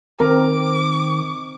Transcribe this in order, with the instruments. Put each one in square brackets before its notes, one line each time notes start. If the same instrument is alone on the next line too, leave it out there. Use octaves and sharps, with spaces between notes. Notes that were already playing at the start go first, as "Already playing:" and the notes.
[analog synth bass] D#3 [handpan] C4 [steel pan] A#4 A#5 [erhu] D6